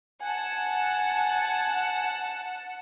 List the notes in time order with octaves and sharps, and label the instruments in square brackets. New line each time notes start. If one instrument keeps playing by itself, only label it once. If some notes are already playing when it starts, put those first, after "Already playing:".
[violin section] F#5 A5 [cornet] G#5